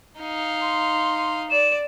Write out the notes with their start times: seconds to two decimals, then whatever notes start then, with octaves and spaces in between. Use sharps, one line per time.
0.20 D#4 F5
0.62 C6
1.51 D5 E7